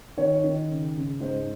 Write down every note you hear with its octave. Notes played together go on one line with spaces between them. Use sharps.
D#3 C#5
D#3
C#3
C#3
G#2 C5